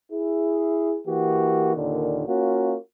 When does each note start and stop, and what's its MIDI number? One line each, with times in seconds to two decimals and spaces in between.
0.12 0.99 64
0.12 0.99 68
1.05 1.72 52
1.05 1.72 58
1.05 1.72 66
1.05 1.72 67
1.74 2.26 39
1.74 2.26 46
1.74 2.26 50
1.74 2.26 51
2.27 2.75 58
2.27 2.75 61
2.27 2.75 65
2.27 2.75 66